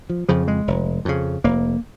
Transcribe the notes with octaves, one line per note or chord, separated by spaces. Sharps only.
F3
F2 C#3 F3
G#3
F1
F2 C#3
F1 A#3